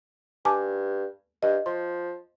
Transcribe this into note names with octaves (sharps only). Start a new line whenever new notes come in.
G2 G#5 A5 D6
G2 D#5
F3 C6